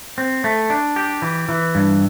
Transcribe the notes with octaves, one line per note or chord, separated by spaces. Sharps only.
C4
A3
D4
G4
E3
E3
G2